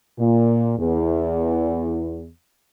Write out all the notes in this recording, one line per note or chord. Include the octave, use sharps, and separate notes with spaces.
A#2
E2